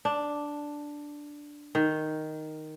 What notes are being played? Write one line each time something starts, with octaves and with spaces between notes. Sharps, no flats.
D4
D#3